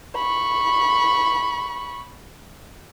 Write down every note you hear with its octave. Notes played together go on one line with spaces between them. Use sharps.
B5 C#6